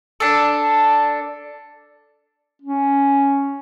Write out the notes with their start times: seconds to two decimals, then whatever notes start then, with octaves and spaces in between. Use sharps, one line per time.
0.20 D4 A4
2.62 C#4